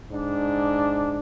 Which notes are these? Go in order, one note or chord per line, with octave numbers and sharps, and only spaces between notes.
G#2 D4